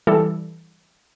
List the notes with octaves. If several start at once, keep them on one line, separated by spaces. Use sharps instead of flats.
E3 G3 E4 A4